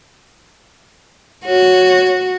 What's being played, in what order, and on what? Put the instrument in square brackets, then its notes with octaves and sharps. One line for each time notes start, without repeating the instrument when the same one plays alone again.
[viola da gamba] F#4 [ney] C#5